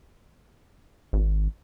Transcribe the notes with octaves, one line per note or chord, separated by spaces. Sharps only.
G#1